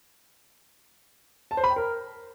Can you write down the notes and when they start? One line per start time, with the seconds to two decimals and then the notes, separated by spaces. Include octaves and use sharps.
1.51 A5
1.57 C5
1.64 B5
1.70 G5
1.76 A#4